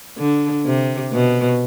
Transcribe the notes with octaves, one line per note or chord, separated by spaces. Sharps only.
D3
C3
B2